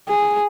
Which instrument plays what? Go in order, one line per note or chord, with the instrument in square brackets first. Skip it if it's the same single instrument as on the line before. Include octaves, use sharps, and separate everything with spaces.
[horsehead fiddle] G#4